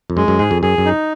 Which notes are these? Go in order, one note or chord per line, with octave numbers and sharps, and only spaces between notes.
F2
F#2 G#3
F#2
G#2 G#4
F2
F#2 G#4
F#2
D#4